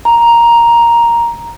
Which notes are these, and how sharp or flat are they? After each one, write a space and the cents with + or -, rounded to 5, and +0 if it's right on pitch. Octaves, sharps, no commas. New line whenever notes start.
A#5 +5